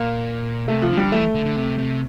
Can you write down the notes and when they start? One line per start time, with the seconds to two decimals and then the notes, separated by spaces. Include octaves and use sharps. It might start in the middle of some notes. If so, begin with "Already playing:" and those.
Already playing: A#2 A#3
0.68 C3 A3
0.82 F3
0.90 D3
0.97 G3
1.12 E3 A3
1.34 D3
1.45 D3
1.56 C3
1.78 C3